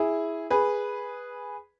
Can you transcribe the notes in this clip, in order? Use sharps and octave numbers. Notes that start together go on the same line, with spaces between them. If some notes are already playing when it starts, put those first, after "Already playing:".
Already playing: E4 G#4
G#4 B4